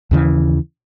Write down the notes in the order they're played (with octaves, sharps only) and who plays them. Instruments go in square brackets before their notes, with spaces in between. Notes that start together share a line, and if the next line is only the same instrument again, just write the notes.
[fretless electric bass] D#2 C#3 E3